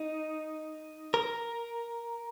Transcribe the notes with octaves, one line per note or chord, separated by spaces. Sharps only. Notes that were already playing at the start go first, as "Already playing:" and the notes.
Already playing: D#4
A#4